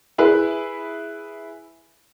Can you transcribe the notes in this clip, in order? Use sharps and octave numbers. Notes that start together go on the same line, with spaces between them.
E4 G#4 B4